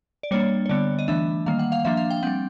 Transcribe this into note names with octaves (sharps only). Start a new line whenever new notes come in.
D5
G3 A#3 D4 C#5
C#5
D3 G3 B3 D5
D#5
E3 A3 D4 E5
D#3 G3 A#3 F5
F#5
F5
F3 A#3 D4 E5
F5
G5
G3 C4 F#5